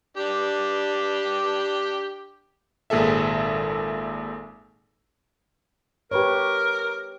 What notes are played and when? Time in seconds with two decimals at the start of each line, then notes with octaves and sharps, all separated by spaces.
0.17 D4 G4
2.90 G#1 A#2 G#4 A4 E5
6.11 G4 A#4 B4 C#5